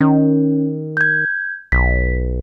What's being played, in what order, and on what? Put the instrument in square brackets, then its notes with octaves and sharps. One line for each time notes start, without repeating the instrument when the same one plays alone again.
[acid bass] D#3 [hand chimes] C#4
[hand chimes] G6 G#6
[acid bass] B1 [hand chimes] B6